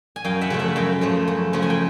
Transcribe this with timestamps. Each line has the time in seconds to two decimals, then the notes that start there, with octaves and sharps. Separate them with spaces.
0.16 G#5
0.24 F#2 F5 G5
0.41 E5 F#5
0.50 C#3 F3 A3
0.59 E5 F#5
0.76 F#2 F5 G5
1.01 C#3 F3 A3
1.28 F#2
1.53 C#3 F3 A3
1.62 G#5
1.70 G5